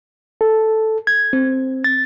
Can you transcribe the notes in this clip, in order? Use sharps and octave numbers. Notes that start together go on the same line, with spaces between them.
A4
G#6
C4
A6